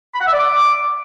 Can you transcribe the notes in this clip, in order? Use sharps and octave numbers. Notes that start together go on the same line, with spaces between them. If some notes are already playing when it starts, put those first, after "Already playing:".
B5
F#5
E5
D5
D6